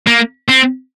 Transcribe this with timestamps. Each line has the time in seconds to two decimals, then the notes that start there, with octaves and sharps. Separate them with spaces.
0.07 A#3
0.48 C4